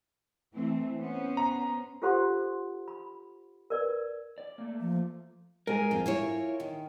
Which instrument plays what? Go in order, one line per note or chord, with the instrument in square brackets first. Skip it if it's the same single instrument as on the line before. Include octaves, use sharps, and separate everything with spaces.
[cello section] E3 A3 C4
B3 C#4 C5
[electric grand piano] A#5
[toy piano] F4 G4 A4 C5 F#5 C6
B5
A#4 B4 D5
[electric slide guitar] D5
A3 A#3
[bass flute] F3
[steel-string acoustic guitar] G#3 [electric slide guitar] A#4 G#5
[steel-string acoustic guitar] F2 C4 F4
E4 F4 C#5
D#3